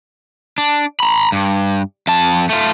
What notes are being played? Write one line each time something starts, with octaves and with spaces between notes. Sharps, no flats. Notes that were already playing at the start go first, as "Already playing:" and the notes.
D4
A#5 B5
G2
F2 A5
A3 F4